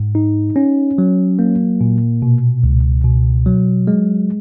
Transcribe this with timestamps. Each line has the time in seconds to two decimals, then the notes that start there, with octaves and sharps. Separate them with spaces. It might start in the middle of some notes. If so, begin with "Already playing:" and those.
Already playing: G#2
0.15 D#4
0.56 C#4
0.98 F#3
1.39 A#3
1.81 A#2
2.22 B2
2.64 C#2
3.04 B2
3.46 F#3
3.87 G#3